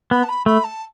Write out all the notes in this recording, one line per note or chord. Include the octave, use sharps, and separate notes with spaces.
B3 B5
A5
B5
A3 B5
A5